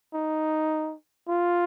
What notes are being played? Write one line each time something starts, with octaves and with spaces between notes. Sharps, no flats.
D#4
F4